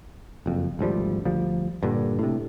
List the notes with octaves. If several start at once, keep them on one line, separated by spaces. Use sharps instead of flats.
F#1 F2
G#1 D2 F3 G3
D2 F3 G3
G2 A#2 D3
A2 C3